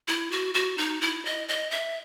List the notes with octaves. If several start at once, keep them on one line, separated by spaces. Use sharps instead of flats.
E4
F#4
F#4
D#4
E4
D#5
D#5
E5